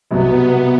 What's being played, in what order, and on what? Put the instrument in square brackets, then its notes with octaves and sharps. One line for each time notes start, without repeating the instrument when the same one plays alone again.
[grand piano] C2 B2 F#3 [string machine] B3